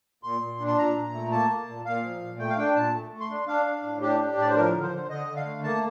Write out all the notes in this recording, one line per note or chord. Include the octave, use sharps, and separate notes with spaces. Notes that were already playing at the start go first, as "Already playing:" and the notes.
A#2 C6
A#2
D4
C6
A#2 A#5
A#2
A3
A#3 A5
A#3
A#2
A#2 F5
F3
A#2
A3 G5
F5
D4 G5
A#2 A5
A3
A3
C6
D4
D4 F5
D4
A2
D4 G4
D4
A2 D5
C5
F3 A#4
D3
C5
D3
D3 D#5
D3
F5
A3
A#3 A5